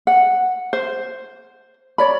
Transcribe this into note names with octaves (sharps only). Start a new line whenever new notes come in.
F#5
C5
C#5 D5 B5